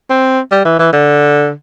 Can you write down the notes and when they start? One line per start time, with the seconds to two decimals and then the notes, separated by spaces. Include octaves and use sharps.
0.10 C4
0.52 G3
0.65 E3
0.79 E3
0.93 D3